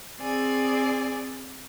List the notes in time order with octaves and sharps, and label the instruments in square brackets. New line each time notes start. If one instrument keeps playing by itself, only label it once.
[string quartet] C4 G#4 D5 G#5